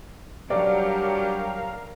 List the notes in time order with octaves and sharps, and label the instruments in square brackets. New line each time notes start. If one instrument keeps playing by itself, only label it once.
[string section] F#3 [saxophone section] G3 D4 G4 [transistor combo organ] A#4 F5 [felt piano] D5